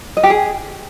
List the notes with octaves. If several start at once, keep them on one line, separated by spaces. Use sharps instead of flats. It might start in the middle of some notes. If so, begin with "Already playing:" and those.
D#5
G4
G#4